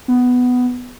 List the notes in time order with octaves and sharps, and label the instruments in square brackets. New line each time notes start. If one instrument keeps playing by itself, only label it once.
[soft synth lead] B3